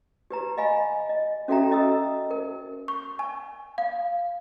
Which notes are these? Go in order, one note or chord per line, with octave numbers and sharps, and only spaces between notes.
G4 B4 A#5
D#5 F5 G#5 B5
D#5
C#4 F#4 A4 E5 G5 A#5
C#4 A4 D#5 A#5 D#6 E6
A#4
C#6
G#5
F5